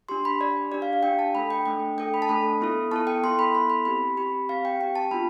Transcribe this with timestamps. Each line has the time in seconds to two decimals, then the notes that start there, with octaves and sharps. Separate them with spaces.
0.09 D4 G4 C6
0.25 B5
0.40 D4 G4 D5
0.72 D4 G4 D5
0.82 F5
0.93 F5
1.03 D4 G4 G5
1.19 A5
1.35 A3 D4 A4 B5
1.50 G5
1.66 A3 D4 A4 G5
1.97 A3 D4 A4 G5
2.14 B5
2.22 A5
2.29 A3 D4 A4 B5
2.61 B3 E4 A4
2.91 B3 E4 A4 A5
3.07 G5
3.23 B3 E4 A4 C6
3.39 B5
3.55 B3 E4 A4 C6
3.70 B5
3.85 C4 G4 B5
4.17 C4 G4 B5
4.49 C4 G4 F5
4.65 G5
4.80 C4 G4 G5
4.96 A5
5.11 B3 D4 F4 B5